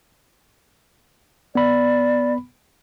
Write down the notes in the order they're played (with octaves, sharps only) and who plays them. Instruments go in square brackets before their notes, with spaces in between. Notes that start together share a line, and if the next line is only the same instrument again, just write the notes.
[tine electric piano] B3 B5 [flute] D5